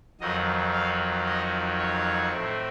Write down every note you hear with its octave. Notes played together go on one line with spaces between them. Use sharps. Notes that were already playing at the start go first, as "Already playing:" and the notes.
F2 D#3 F#3 D#5
F5
D#5
C#5
A2 A3 C4